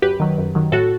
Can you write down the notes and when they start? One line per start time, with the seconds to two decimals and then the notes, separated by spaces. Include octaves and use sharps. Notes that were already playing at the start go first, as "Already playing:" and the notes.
0.02 F#2 G4 B4
0.20 D#3 F#3
0.38 F#2
0.55 D#3 F#3
0.72 A2 F#4 A4